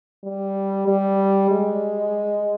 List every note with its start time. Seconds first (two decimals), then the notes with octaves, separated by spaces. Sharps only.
0.24 G3
0.88 G3
1.51 G#3